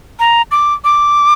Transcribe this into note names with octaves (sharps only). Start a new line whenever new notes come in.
A#5
D6
D6